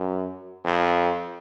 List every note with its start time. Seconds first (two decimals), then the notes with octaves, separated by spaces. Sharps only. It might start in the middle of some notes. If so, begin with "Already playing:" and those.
Already playing: F#2
0.64 F2